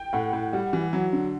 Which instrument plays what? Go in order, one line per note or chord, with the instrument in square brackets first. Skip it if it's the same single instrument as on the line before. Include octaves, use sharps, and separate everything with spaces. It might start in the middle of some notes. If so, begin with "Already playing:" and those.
Already playing: [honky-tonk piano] G5
[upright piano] A2 [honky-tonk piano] F#5
[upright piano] A2
[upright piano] G3 [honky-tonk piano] F#5
[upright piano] E3
F#3
D3